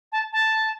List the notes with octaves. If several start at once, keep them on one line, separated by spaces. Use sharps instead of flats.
A5
A5